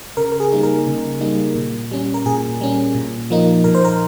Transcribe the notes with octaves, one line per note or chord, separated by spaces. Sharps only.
C#3 A#4
A#4
G#4
G3 A#3 D#4
A#4
C#3
G3 A#3 D#4
A#2
G3 C#4
A#4
A#2 G#4
G3 C#4
A#2
F3 A#3 D#4
A#2 A#4
C5
A#4